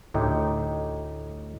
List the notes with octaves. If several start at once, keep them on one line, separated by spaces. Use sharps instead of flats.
D2 A2 D#4 G4